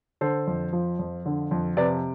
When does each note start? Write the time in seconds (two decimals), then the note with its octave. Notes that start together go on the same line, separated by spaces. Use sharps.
0.21 D3 A4 C5
0.47 F2
0.73 F3
0.99 F2
1.26 D3
1.51 F2
1.77 C3 B4 D5